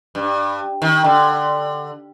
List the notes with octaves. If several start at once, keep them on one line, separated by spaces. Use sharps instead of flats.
G2
D#3
D3